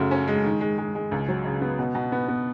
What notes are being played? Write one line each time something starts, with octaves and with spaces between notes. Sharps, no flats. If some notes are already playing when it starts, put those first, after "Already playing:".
Already playing: F#2 C#3 A3
C#4
G#3
D#3
G#3
G#3
G#3
C#2
F#3
C#3
B3
B2
B2
B3
B3